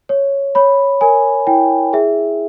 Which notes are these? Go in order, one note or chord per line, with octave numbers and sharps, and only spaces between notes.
C#5
C#5 B5
A#4 G#5
E4 G5
G#4 E5